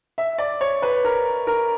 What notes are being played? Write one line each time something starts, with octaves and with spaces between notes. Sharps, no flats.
E5
D5
C#5
B4
A#4
A#4